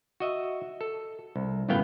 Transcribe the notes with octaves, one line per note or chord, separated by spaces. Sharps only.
F#4 D#5 E5
A4
C2
G1 F#2 A2 B3 F5 G5